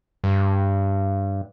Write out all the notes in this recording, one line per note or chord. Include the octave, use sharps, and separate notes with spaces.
G2